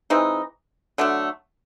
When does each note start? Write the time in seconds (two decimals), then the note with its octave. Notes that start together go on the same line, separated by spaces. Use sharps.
0.10 E3 G#3 C4 D#4
0.98 D3 F#3 A3 D4